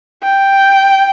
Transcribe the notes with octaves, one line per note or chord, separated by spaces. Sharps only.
G5